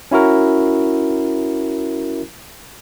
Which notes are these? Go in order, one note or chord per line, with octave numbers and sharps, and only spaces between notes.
C#4 E4 F#4 A#4